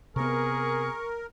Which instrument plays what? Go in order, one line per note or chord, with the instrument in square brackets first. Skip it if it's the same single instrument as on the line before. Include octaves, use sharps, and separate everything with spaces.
[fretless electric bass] C3 B3 [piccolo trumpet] G#4 [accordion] A#4 [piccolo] C#6